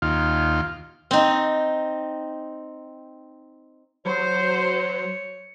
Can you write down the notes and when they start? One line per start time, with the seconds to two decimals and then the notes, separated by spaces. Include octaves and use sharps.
0.02 D#2 F4
1.11 C4 D#4
4.06 F#3 C5 C#5